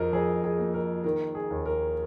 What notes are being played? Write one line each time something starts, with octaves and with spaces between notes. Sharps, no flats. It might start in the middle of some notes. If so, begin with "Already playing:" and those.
Already playing: F2 F3 A#4 D#5
F2 G#4
G#4
A#3
A#4
D#3 A#4
G#4
D#2
A#4